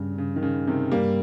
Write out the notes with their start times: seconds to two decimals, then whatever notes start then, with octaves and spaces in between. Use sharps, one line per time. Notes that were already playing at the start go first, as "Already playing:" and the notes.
Already playing: G2 C#3
0.18 C#3
0.36 D#3
0.43 C#3
0.67 C3 D#3
0.91 G2 G3 A#3